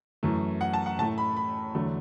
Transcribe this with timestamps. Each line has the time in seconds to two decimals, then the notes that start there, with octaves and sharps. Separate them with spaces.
0.23 F#2 E3 A3
0.61 F#5
0.73 A5
0.86 F#5
0.99 A2 A5
1.02 A3
1.18 B5
1.37 B5
1.75 E2 D3 F#3 A3